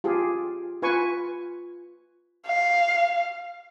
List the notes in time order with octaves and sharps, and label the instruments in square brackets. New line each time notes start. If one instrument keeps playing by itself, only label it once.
[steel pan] F4 G4 G#4
F4 B4 G#5 C#6
[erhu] F5